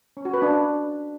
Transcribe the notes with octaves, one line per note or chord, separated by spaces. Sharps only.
C#4
F#4
B4
D4